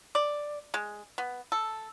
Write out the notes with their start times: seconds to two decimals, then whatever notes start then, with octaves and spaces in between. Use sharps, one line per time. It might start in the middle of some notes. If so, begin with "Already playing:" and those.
0.15 D5
0.74 G#3
1.18 B3
1.52 A4